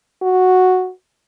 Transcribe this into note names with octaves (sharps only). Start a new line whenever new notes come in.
F#4